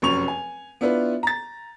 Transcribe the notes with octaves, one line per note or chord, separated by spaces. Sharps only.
F1 F#2 C#4 C#6 F7
G#5
B3 D4 E4 F4 B4
A#5 A6